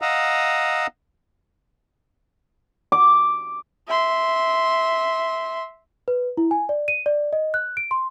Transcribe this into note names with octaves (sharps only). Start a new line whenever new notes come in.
D#5 F5 F#5 A#5 D#6 E6
D6
E5 C6
B4
E4
G#5
D5
D#7
D5
D#5
F#6
D7
C6